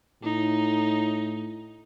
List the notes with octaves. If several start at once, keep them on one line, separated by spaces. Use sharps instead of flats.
A2 D#4